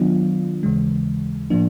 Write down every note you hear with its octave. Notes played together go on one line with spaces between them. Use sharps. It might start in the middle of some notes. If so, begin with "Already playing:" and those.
Already playing: D#3 F#3 B3 D4 F4
D#2 C#3 E3 G#3
A2 F3 A#3 D4